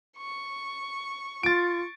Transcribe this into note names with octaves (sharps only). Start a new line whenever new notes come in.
C#6
F4 A6 D7